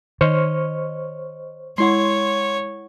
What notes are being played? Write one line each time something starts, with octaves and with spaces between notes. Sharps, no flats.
D#3 C5 C#5 D#5 C#6 F6
G#3 E4 C#5 F#5 C6